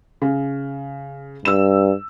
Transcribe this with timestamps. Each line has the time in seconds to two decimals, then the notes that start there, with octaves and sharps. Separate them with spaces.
0.22 C#3
1.45 G2 E6 E7